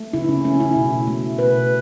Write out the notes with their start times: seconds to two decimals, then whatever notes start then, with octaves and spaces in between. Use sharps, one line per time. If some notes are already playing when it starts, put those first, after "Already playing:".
Already playing: A3
0.13 C#3 E4
0.29 C#4
0.45 A3 C#4
0.60 E4
0.76 B2
1.07 A3
1.39 B2 B4